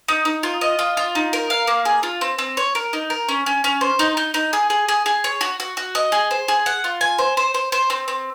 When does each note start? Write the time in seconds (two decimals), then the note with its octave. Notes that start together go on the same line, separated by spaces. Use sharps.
0.08 D#4
0.25 D#4
0.43 F4
0.61 D#5
0.79 F4
0.97 F4
1.15 D#4
1.33 A#4
1.50 F5
1.67 A#3
1.85 G#4
2.03 F4
2.21 C4
2.39 C4
2.57 C#5
2.75 A#4
2.93 D#4
3.10 A#4
3.29 C#4
3.46 C#4
3.64 C#4
3.81 C5
3.99 D#4
4.17 D#4
4.34 D#4
4.53 G#4
4.70 G#4
4.88 G#4
5.06 G#4
5.24 C#5
5.41 F#4
5.60 F#4
5.77 F#4
5.95 D#5
6.12 G#4
6.31 C5
6.48 G#4
6.66 F#5
6.84 F4
7.01 G#5
7.19 C5
7.37 C5
7.54 C5
7.72 C5
7.90 C4
8.08 C4